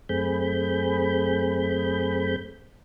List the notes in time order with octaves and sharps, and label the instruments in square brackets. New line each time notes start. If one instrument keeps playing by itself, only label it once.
[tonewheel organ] F#2 A3 C4 G#4 B5 G6